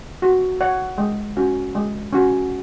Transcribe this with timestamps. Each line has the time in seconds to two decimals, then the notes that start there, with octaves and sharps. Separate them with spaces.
0.22 F#4
0.61 C#5 F#5
0.98 G#3
1.37 C#4 F#4
1.75 G#3
2.13 C#4 F#4